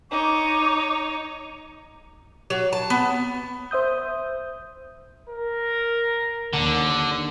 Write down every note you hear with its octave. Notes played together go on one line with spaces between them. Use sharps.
D#4 C#5 D6
F#3
A5
B3
C5 E5 D#6 G6
A#4
D#2 D3